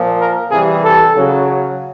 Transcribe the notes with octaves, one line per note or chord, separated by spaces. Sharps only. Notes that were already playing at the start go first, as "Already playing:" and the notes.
Already playing: A#2 F3
A#4
C3 E3 G3 G#4
A4
C#3 F#3